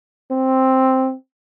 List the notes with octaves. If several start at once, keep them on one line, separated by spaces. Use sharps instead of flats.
C4